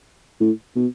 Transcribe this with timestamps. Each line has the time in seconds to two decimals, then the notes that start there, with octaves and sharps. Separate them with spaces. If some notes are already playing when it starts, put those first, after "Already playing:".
0.40 A2
0.76 B2